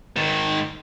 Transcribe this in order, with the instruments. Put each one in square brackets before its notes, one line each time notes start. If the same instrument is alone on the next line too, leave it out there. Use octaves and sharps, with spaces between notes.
[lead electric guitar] G#2 D#3